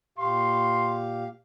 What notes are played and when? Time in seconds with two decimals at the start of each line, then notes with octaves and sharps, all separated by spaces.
0.18 A#2 G4 F5 C6